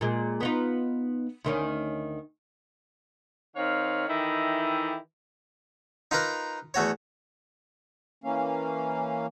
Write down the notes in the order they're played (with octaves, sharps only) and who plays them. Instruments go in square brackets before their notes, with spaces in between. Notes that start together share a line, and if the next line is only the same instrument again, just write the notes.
[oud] A#2 G#3
B3 D#4 F4
D2 D#3 C#4
[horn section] D#3 C4 C#5 F5
D#3 E3 E4 G4 A4 D#5
[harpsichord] D#4 F4 A#4 B4 A#5
E2 A3 F#4 C#5
[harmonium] E3 A#3 C#4 F5